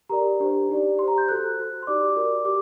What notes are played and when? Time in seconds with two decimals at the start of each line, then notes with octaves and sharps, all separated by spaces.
0.10 G4 A#4 D5 A#5
0.40 D4 G4 C5
0.69 D#4 G4 D5
0.98 G4 C6
1.03 C5 A#5
1.18 G6
1.28 F#4 A4 C5 F#6
1.57 F#4 C5
1.83 C6
1.87 D#4 G4 D5 D6
2.16 F#4 A#4 D5
2.45 G4 D6